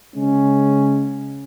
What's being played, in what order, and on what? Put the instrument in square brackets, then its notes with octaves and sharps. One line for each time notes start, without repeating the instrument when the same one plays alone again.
[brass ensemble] C#3 G#3 C#4